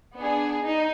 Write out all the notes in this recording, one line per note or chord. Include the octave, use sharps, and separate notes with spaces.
B3 D4 G#4
D#4